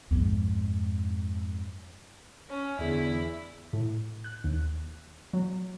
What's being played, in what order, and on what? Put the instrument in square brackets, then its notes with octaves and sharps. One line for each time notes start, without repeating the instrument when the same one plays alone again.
[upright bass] F2 G#2
[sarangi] C#4 [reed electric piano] C#5
[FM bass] E2 [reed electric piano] D3 G#4 D5 [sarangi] E4
[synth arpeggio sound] A2
F#6
D#2
F#3